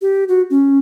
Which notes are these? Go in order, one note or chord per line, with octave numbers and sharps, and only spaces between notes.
G4
F#4
C#4